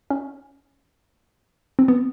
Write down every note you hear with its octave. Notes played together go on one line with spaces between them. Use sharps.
C#4
C4
B3